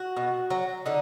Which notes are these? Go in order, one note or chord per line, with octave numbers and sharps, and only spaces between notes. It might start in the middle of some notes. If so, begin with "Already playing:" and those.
Already playing: F#4
B2
F#3
D3 D#4